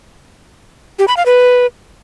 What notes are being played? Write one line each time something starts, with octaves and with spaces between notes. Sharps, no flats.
G4
B5
F5
B4